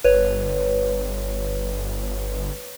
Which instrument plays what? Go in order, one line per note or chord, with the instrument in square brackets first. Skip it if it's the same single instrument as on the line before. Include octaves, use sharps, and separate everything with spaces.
[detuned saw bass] G1 [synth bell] B4 C#5